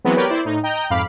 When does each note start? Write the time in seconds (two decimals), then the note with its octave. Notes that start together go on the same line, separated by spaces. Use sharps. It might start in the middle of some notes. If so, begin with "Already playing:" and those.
0.04 E3 F#3 G#3 B3 C4
0.16 G4 A#4 B4 C#5 D5 G5
0.29 E4 C5 D5
0.45 A2 D#4
0.63 D#5 G5 A#5 G6
0.90 F2 G#2 F5 B5 D6